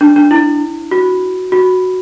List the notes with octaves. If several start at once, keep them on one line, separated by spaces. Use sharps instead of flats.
D4
D4
E4
F#4
F#4